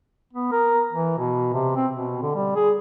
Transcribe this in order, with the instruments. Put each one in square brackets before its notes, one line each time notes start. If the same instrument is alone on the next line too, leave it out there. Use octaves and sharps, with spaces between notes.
[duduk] B3
A#4
E3
B2
C3
C4
B2
D3
G3
G#4